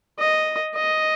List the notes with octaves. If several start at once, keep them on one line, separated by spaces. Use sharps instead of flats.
D#5
D#5